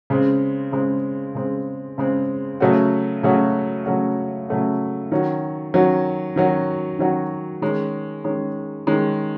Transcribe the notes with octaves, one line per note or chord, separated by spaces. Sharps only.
C#3 G#3 C4
C#3 G#3 C4
C#3 G#3 C4
C#3 G#3 C4
C#3 F#3 A3 C#4 F#4
C#3 F#3 A3 C#4 F#4
C#3 F#3 A3 C#4 F#4
C#3 F#3 A3 C#4 F#4
D#3 F#3 C#4 F#4
D#3 F#3 C#4 F#4
D#3 F#3 C#4 F#4
D#3 F#3 C#4 F#4
D#3 G#3 C#4
D#3 G#3 C#4
D#3 G#3 C#4